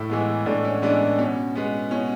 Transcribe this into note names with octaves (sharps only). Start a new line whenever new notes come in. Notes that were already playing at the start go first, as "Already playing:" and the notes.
Already playing: A2 E4
E3 G#3 B3
A2 D4
C#4
E3 G#3 B3 D4
B2 C#4
G#3 B3
B2 C#4